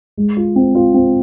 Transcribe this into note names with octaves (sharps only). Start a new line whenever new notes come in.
G#3
F4
C4
F4
C4